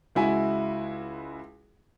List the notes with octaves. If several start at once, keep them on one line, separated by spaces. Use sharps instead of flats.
C#2 G#3 E4 F#4 E5 G#5